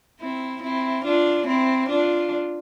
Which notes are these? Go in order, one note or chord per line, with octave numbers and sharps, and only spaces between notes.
C4 E4
C4 E4
D4 F4
C4 E4
D4 F4